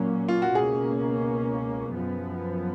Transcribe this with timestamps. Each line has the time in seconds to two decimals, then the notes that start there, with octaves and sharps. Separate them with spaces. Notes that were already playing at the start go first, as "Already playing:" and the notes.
Already playing: A#2 F#3 A#3 C#4
0.28 F4
0.42 F#4
0.55 C#2 B2 A#3 C#4 G#4
1.95 F#2 F3 B3